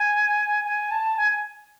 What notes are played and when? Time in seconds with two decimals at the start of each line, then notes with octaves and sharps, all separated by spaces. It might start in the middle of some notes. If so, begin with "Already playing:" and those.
Already playing: G#5
0.65 G#5
0.91 A5
1.17 G#5